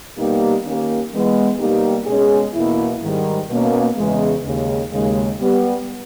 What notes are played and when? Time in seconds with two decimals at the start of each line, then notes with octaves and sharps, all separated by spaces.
0.16 B2 G3 A#3 D#4 G4
0.64 D#3 A#3 C#4 G4
1.11 E3 G#3 B3
1.58 B2 G3 A#3 D#4 G4
2.06 B2 G#3 C#4 G#4
2.54 E2 B2 A#3 E4
3.01 G#2 D#3 G3
3.48 B2 A#3 C#4
3.96 E2 C#3 E3 G#3
4.44 D#2 C#3 G#3
4.91 D#2 C#3 G#3
5.38 G3 B3 G4